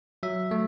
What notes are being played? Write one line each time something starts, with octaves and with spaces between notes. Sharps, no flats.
F#3 E5
A3